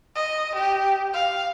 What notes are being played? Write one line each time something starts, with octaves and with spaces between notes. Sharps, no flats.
D#5
G4
F5